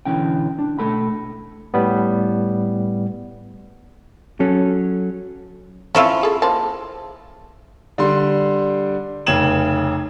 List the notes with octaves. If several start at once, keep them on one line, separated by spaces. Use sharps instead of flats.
B1 D3 E3 C#4 G5
D4
B2 A3 A4 B5
A2 G3 B3
F#3 C#4 A4
E3 C4 C#4 E4 F4 A4
G#4 A4
A#3 C5 A5
D3 G3 C6
F1 C#3 G5 G#6 E7 F#7